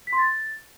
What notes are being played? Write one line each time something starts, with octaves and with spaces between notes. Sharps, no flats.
B6
C6
A6